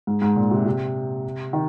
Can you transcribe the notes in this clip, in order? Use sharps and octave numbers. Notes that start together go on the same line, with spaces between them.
G#2
G#2
A#2
C3
C3
D#3